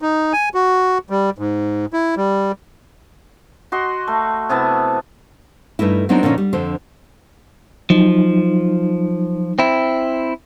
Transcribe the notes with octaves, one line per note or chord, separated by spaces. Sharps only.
D#4
G#5
F#4
G3
G#2
E4
G3
F#4 D#5 C6
A3
C3 B3 E4 A5
G2 A3 D#4 E4
F#3 B3 C4 D4 D#4 A#4
A#2 D3 F3 A#3 C#4 D#4
G3
F2 D3 C5
F3 F#3 D#4
C4 E4